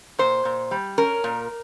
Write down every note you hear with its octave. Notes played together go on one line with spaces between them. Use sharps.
A#2 C5
A#2
G3
C#4 A#4
A#2